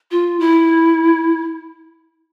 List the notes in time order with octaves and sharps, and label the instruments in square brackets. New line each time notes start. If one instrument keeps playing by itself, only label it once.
[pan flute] F4
E4